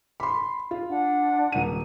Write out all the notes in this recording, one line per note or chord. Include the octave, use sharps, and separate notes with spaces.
B5 C6
F4
D4 F#5
D#1 D#7